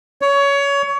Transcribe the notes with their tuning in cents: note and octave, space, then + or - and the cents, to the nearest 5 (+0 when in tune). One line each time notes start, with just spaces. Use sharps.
C#5 +20